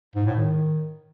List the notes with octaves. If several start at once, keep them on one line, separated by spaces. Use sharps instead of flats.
G#2
A2
D#3